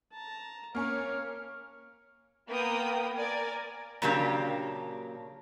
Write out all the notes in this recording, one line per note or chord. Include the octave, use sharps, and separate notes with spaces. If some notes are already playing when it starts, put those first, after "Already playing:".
A5 A#5
A#3 C#4 C#5 F6
A#3 B3 G5 D#6
A#4 D5 G#5
A#2 C#3 F#3 A#3 D4 G4